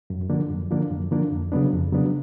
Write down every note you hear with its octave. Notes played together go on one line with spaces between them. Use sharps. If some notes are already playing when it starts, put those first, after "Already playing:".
F#2
D3 F3 A#3 D4
F#2
D3 F3 A#3 D4
F#2
D3 F3 A#3 D4
F2
C#3 F#3 B3 D4
F2
C#3 F#3 B3 D4